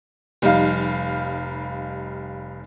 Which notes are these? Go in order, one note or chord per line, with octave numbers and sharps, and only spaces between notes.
F1 G3 D#4 F5